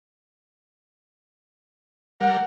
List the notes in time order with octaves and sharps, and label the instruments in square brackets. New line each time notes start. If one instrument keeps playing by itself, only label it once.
[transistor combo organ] G3 A#4 [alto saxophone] F#5